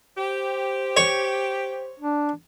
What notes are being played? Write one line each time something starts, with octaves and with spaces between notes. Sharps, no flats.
G4 C5
C#5
D4